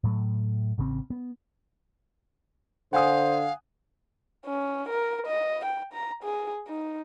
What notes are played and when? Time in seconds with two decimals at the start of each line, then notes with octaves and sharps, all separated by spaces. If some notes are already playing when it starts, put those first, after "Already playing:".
0.04 A2 F#3 A3
0.78 A1 C#3 E3 C4
1.10 B3
2.93 D3 C5 F5 F#5 G#5 D#6
4.46 C#4
4.89 A#4
5.27 D#5
5.65 G5
5.93 A#5
6.23 G#4
6.68 D#4